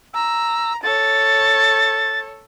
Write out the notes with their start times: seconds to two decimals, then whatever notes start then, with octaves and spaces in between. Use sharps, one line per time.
0.14 A#5 E6
0.83 A4 C#5 A6